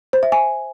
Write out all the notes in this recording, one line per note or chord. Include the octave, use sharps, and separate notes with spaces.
C5
E5
G#5